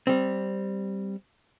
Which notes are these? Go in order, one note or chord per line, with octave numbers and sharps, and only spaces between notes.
G3 C4